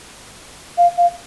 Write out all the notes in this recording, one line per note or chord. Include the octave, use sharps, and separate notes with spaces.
F5
F5